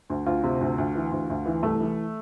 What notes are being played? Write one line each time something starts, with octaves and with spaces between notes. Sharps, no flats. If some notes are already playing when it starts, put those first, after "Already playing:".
D2
D2 F4
C3
D2
D2
E3
D2
D2
E3
C2 A3
E3